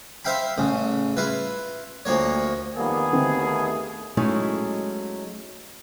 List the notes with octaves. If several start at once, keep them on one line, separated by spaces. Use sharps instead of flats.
C5 E5 F5 G5 B5
A1 C#3
E4 F4 B4
D2 F3 A#3 C#5
F2 D#3 G3 A#3 B3 G#4
D#2 D3 E3 A3 C4
F#3 G#3 A3 C#4 D#4 E4